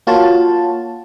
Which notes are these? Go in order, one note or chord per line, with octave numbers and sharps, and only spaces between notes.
A#3 F4 F#4 C#5 A5